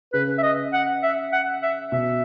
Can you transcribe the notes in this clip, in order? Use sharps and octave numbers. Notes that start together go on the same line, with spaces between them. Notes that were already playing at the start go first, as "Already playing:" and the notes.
C#3 B4
E5
D#5
F#5
E5
F#5
E5
B2 E5